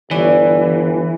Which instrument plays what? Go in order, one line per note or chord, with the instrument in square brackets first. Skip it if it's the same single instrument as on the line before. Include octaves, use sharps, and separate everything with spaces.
[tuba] G1 [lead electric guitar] E3 [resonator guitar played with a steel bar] C#5 D5